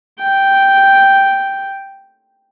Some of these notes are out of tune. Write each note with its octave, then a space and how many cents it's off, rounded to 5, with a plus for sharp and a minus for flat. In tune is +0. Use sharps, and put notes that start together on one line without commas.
G5 -5